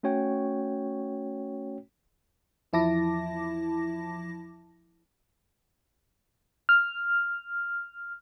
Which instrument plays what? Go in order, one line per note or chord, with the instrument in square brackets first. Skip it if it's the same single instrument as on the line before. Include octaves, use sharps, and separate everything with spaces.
[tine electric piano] A3 C#4 F#4 C#5 G5
[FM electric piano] E2 F3 E4 A5 D6 A#6
F6